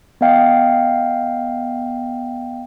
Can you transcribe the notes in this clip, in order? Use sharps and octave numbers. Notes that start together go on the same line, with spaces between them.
B3 D#5 F5 G5